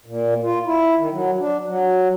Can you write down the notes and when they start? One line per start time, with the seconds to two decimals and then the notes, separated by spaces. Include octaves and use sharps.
0.06 A#2
0.43 F4
0.66 E4
0.98 D#3
1.12 F#3
1.38 D4
1.66 F#3